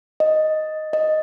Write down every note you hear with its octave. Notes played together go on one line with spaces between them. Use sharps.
D#5
D#5